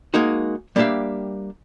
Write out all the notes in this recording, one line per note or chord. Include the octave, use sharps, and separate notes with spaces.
G#3 A#3 D#4 F#4
G3 A#3 D4 G4 E5 F5